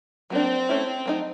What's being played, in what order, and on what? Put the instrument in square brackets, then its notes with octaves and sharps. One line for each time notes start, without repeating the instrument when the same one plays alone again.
[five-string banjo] F#3 A#3 D4 [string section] C4
[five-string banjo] A3 C#4 E4
F#3 A3 C4 D#4